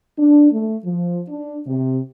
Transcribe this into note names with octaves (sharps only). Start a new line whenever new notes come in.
D4
A3
F3
D4
C3